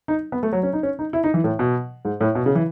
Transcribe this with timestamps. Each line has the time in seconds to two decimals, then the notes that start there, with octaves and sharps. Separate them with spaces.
0.08 D#4
0.32 B3
0.43 A3
0.53 F#3
0.63 C#4
0.73 D#4
0.83 C#4
0.99 D#4
1.13 E4
1.24 D#4
1.34 E3
1.44 A2
1.59 B2
2.05 G#2
2.21 A2
2.35 B2
2.46 C#3
2.55 E3